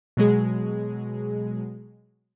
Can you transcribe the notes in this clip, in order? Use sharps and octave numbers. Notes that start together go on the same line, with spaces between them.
B2 F#3 G#3 G#4